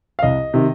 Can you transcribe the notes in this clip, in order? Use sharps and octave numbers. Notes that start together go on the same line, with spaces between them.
F5
C2 D#5
C3 D#3